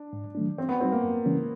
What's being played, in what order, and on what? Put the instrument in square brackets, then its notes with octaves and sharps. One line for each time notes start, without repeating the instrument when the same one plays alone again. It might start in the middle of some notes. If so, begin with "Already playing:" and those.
Already playing: [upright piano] D4
[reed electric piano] G#2
D#3 F#3 A3 D4
[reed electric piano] E3 [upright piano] C4
[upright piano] B3
[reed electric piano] G3 B3 D#4 F#4 [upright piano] C4
[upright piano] A#3
[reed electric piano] F#2
C#3 E3 G#3 C#4